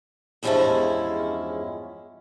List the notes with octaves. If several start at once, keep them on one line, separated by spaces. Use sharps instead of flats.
E2 G2 F3 G#3 C#4 E4